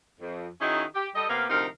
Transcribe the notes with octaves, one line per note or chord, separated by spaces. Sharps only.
F2
D#3 C#4 D#4 E4 F#4 G#4
G4
G3 A4 D#5
C3 A#3 B3 G4 F5
D2 C3 F3 D#4 A#4 F5